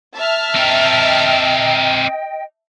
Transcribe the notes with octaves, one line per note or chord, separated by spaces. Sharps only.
E5 A5 F6
C4 A#4 D#5 G5